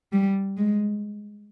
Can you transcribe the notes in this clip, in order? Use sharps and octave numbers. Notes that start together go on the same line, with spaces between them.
G3
G#3